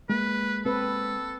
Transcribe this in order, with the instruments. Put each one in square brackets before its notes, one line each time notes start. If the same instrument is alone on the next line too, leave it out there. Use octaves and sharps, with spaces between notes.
[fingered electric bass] G#3 A#3 [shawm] B4
[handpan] C4 B4 [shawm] A4